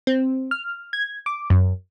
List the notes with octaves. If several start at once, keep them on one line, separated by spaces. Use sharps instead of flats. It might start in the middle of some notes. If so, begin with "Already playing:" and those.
C4
F6
G#6
D6
F#2